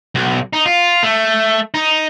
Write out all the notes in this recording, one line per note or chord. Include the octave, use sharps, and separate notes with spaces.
B1
D#4
F4
A3
D#4